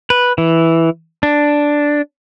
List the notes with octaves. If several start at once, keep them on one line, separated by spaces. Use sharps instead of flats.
B4
E3
D4